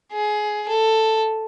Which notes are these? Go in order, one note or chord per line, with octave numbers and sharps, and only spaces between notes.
G#4
A4